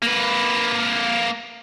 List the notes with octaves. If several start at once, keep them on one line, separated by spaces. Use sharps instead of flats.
A#3 B4